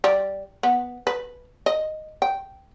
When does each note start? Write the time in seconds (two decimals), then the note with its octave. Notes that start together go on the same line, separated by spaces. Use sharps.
0.04 G3
0.63 B3
1.07 B4
1.66 D#5
2.22 G5